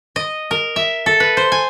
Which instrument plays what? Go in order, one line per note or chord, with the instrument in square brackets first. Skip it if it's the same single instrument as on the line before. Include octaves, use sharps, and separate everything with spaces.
[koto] D#5
A#4
E5
A4
B4
C5
G#5